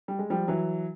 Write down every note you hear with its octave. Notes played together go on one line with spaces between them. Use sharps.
G3
G#3
F3 G3
E3 F#3